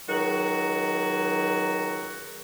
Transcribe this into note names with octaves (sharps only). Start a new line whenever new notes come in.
C#2 D#3 F#3 F#4